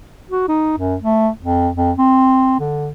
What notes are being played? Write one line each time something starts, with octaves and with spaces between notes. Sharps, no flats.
F#4
D#4
F#2
A3
F2
F2
C4
D3